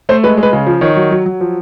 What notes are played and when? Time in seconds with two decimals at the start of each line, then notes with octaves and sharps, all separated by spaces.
0.09 A3 C5
0.23 G#3 B4
0.37 G#3
0.43 B4
0.53 C#3
0.67 F3
0.81 D#3 C#5
0.96 F#3
1.11 F#3
1.26 F#3
1.41 F3